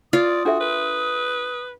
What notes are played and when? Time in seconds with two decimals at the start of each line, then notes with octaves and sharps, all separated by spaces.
0.13 F4 D5 D#6
0.45 D4 F#4 A4 E5
0.60 A#4 B4